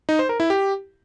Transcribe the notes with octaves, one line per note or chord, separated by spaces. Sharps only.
D#4
C5
A#4
E4
G4